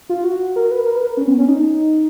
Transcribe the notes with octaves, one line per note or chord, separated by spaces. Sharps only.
F4
F#4
A#4
B4
A#4
B4
A#4
C#4
B3
C#4
D#4